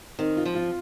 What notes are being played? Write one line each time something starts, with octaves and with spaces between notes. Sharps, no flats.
D#3 C4
F4
F3
F4